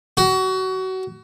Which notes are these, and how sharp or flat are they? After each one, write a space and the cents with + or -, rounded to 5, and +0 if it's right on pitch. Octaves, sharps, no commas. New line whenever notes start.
F#4 +25